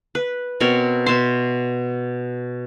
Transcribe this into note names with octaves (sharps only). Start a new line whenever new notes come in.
B4
B2 C4 A#4 C#5
B2 E5 C6